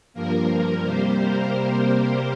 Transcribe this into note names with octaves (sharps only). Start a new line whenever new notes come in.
G2 F3 A#3 A#4
C3 G3 A#3 G4 C5
A#4